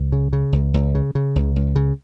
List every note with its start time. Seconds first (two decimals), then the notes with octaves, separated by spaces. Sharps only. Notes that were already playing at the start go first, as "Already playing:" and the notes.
Already playing: C#2
0.12 C#3
0.33 C#3
0.53 C#2
0.74 C#2
0.95 C#3
1.15 C#3
1.36 C#2
1.56 C#2
1.76 C#3